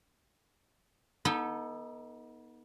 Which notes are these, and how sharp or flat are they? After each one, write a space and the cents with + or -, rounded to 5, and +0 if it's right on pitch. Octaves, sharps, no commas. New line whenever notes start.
B3 -30 D#4 +15 A4 +10